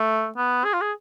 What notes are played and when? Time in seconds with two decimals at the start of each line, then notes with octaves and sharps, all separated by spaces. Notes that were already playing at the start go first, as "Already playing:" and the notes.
Already playing: A3
0.37 B3
0.65 G#4
0.73 F4
0.81 G#4